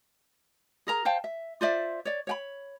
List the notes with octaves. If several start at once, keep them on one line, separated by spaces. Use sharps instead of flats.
G#4 A#4 A#5
C5 F5 G5 A5
E5
F4 C5 D5 E5
C#5 D5
C#5 G5 B5